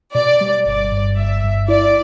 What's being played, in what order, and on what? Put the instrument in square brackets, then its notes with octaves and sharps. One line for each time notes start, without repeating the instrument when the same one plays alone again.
[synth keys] B2 [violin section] D5
[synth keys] G3
[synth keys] G1 [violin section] D5
[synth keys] G2
[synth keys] G1 [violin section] E5
[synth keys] G2
[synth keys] E4 [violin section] D5